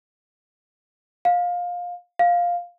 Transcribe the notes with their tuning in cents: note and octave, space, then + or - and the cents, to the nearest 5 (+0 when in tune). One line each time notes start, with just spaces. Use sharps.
F5 +20
F5 +5